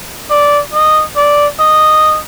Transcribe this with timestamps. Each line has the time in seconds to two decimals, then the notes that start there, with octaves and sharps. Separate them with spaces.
0.30 D5
0.74 D#5
1.16 D5
1.59 D#5